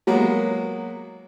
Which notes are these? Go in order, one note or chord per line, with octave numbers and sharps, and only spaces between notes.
F#3 G#3 A#3 B3